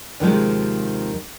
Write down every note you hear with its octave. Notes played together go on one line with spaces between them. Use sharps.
D#2 C3 D#3 F3 G3 G#3